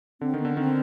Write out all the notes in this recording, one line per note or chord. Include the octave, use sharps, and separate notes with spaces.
D3 C4
D#3
B3
D3
D#3 C4